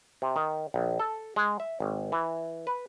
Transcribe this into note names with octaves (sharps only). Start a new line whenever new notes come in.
C3
D#3
A#1
A4
G#3
E5
G#1
E3
B4